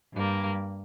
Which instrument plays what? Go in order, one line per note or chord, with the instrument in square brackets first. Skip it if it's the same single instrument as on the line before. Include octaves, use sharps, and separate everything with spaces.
[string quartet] G2 G3 A#3